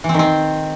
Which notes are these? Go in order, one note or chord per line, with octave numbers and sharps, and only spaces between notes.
E3
C4
D#3
C4